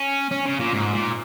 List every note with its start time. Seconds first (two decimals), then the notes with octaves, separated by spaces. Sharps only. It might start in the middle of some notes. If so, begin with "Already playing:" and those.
Already playing: C#4
0.31 C#4
0.45 C#3
0.59 A#2
0.73 G#2
0.93 A#2